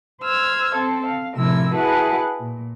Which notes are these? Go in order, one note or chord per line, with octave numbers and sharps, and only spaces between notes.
C5 E6 F6 G#6
C4 A4 C5
F5
A2 C3 F3 E4 A#4 E6
E4 F#4 G#4 B4 F#5 A5
A#2